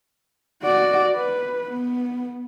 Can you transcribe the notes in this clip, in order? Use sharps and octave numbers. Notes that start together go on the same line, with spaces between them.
F#4 D5
B4
B3